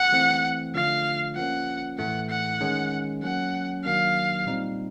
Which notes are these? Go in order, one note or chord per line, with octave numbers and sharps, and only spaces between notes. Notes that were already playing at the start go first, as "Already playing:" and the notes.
Already playing: F#5
E3 A3 C4
D3 F3 A3 D4 F4 F5
F3 A#3 C#4 F#5
A2 E3 A3 F#5
F#5
D#3 G#3 C#4
F#3 A#3 C#4 F#5
D#3 F#3 A#3 D4 F5
A#2 G3 C4 D#4